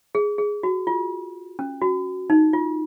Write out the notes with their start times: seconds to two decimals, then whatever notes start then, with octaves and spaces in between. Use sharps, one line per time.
0.15 G#4
0.38 G#4
0.63 F#4
0.87 F4
1.59 C#4
1.82 F#4
2.30 D#4
2.53 F4